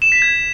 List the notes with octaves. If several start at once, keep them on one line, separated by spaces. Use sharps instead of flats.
E7
B6
G#6